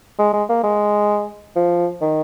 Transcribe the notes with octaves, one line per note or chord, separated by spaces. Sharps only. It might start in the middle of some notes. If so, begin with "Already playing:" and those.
G#3
G#3
A#3
G#3
F3
D#3